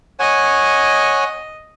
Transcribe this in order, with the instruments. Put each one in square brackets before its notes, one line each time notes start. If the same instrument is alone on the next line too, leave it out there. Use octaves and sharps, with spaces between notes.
[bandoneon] C#5 F#5 G#5 [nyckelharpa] D#5